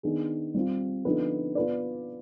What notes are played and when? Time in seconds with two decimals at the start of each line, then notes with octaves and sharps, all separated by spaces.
0.03 D#3 B3 D4 G#4
0.54 G3 C4 F4
1.05 D3 F3 B3 D#4 B4
1.55 B3 F4 B4 D5